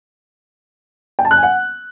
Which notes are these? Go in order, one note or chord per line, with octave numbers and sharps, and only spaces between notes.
G5
A5
F#6
G#5
F#5